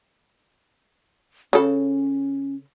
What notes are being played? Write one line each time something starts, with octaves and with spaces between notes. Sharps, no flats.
C#3 C#4 A4